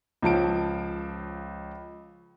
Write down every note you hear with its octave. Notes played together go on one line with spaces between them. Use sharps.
C#2 F3 A5 D7